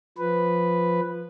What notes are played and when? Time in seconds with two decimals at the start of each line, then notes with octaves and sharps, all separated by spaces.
0.18 F3 B4